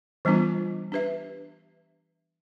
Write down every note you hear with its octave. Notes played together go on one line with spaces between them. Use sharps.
E3 G3 B3 D4 F4
D4 G4 B4 E5